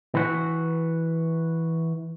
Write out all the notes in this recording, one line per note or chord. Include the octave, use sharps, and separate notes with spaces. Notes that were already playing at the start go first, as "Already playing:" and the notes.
E3 F#4